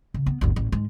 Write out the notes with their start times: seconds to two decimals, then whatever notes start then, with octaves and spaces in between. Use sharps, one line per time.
0.14 C#3
0.26 B3
0.41 G1 D2
0.56 A1
0.72 G#2 G#3